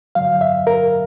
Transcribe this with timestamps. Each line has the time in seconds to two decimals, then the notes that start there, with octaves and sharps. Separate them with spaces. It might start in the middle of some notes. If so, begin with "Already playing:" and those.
0.15 G2 D3 F#3 F5
0.41 E5
0.67 A#4